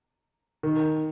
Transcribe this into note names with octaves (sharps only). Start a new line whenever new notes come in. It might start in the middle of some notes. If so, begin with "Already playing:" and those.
D#3